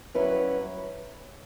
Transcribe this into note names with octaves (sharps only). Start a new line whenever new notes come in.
G2 F#3 C#4 E4 B4